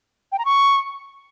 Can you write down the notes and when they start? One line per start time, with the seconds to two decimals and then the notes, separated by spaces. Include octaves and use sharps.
0.32 G5
0.39 A#5
0.45 C#6